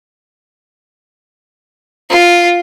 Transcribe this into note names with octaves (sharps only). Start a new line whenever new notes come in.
F4